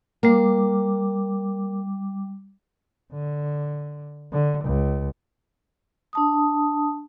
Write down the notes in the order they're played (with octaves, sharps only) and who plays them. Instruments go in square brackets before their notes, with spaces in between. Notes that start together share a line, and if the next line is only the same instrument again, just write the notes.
[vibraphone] G3 D6 [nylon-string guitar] A#3
[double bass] D3
D3
C#2
[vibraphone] D4 A5 D#6